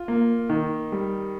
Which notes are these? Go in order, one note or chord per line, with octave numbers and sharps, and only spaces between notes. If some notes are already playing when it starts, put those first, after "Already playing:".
Already playing: F4
A#3
D#3
G3